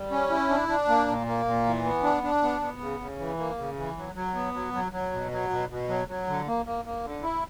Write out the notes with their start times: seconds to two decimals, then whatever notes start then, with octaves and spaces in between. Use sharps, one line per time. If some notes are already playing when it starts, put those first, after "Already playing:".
Already playing: G3
0.11 C#4
0.30 E4
0.49 D4
0.68 D4
0.88 A#3
1.07 A#2
1.27 A#3
1.45 A#2
1.65 E3
1.84 B3
2.03 D4
2.23 D4
2.43 B3
2.61 B3
2.80 C#3
3.00 C#3
3.19 E3
3.38 A#3
3.58 C#3
3.77 E3
3.97 F#3
4.15 F#3
4.35 B3
4.54 F#3
4.73 F#3
4.92 F#3
5.12 B2
5.31 F#3
5.50 B2
5.70 B2
5.89 F#3
6.08 F#3
6.27 D3
6.47 A#3
6.66 A#3
6.85 A#3
7.04 D3
7.23 E4